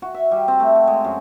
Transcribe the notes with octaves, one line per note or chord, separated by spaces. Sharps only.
F#4
E5
G3
C4
A3
F#4
G#3
F#2